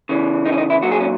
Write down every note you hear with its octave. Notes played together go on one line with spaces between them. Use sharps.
C#3 E3
D#4
C#4
D#4
E4
A#2 F#3 F#4
G#4
C#4